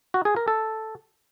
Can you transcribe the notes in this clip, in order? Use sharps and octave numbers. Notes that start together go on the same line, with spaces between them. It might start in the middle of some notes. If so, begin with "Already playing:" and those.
F#4
G#4
A#4
A4